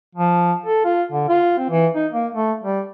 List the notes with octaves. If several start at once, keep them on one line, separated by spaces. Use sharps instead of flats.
F3
A4
F4
D3
F4
C4
E3
D#4
A#3
A3
G3